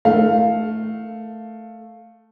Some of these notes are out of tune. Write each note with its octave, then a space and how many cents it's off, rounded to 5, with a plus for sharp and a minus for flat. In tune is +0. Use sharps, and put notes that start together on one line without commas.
A3 +0 A#4 +0 F5 +0